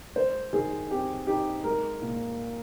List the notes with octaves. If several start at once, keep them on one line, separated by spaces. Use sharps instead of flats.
G#3 C5
D#3 G#4
C4 G4
D#4 G4
G#3 A#4
A#2